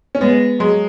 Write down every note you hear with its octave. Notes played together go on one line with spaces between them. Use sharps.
C#4
G#3 B3
F#3 G#3